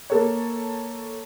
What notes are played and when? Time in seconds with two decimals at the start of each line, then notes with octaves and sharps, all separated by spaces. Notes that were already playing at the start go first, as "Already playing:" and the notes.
0.10 A#3 A4 C#5